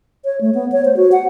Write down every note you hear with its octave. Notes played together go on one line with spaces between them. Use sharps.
C#5
A3
B3
C#5
C5
F#4
F#5